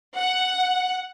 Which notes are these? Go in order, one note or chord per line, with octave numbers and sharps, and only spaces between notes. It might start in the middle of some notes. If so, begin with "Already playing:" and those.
F#5